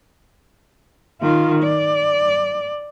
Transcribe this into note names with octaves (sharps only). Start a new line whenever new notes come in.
D#3 F4
D5